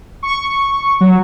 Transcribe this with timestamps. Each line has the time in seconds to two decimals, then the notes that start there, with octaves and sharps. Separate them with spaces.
0.23 C#6
1.01 F#3